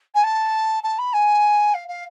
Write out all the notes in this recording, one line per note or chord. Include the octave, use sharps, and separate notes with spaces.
G#5
A5
A5
B5
G#5
F5
F5